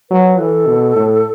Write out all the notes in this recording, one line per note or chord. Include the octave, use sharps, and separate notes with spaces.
F#3 B4
E3 A4
B2
A2